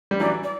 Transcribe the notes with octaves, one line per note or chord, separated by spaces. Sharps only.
G3
E3 F#3 D5
D5